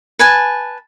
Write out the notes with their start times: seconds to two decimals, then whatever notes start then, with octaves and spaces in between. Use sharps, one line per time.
0.19 B4 G#5 A5